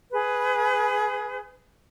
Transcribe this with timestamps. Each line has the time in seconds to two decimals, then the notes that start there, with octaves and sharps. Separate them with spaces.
0.13 G#4 B4